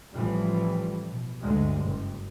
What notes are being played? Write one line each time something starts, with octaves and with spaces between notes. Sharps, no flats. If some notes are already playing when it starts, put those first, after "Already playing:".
A1 A2 E3 F3 G3
B2
D2 G2 G#3
F#1